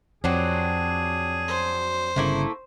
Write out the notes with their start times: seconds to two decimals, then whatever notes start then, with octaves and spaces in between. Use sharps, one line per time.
0.24 F2 F#3 C4 D4 G#4
1.48 C5
2.16 G1 C#3 A3 A#3 E4